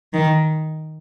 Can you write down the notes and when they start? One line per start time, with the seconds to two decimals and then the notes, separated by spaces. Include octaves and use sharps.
0.14 D#3